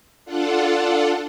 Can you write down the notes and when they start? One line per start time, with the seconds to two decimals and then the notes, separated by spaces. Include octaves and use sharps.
0.25 D4 F4 A4 F#5